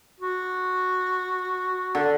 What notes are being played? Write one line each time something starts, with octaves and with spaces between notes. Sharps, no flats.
F#4
D3